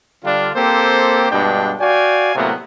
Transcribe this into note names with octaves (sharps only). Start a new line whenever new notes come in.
D3 G3 D4 F4
A#3 C4 G4 A4 C5
G2 B2 G#3 D4 G5
F#4 D5 F5 G5 G#5
A2 C3 F#3 A#3 B3